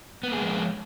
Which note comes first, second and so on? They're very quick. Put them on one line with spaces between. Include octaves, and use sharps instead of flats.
B3 A#3 G#4 G#3 F3